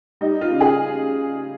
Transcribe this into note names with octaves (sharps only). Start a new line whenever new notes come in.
G3 D#4
F4
C#3
G#4